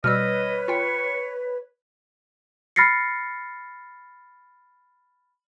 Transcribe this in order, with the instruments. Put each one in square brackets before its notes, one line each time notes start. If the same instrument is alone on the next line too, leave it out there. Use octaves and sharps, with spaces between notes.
[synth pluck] B2 G3 E6 [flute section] B4 C#5 [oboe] D#5 [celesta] F6
[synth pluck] F4 G5 [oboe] C#6
[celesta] B5 F6 A6 A#6 C7 C#7